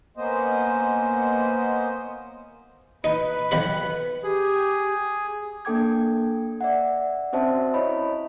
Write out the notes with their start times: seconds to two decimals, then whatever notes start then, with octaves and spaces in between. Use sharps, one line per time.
0.17 A#3 B3 C#4 C5 D#5
3.04 D#4 B4
3.51 B1 D#3 B5
4.24 G4 G#4
5.65 A#3 D4 A4 G5 D6 G#6
6.61 D5 E5 F#5
7.33 C4 C#4 F#4 C5 E5 A5
7.74 E4 C#5 D#5 B5